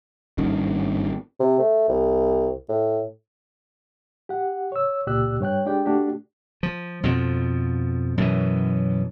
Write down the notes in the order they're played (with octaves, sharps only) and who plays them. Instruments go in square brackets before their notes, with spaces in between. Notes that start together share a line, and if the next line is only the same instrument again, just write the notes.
[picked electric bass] G#1 G2 D#3 C#4
[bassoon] C3
A3
C2
A2
[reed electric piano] G4 F#5
C#5 E6
C#2 A#2 G4 D5 E6 F#6
G2 C#5 G5 F#6
G#3 D4 G4 D5 G5
A3 D4 F#4 G4
[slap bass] F3
F2 B2 F3
F#2 B2 E3